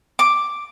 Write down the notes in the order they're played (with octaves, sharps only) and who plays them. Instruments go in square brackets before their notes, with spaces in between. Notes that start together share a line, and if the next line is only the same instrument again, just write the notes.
[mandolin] D6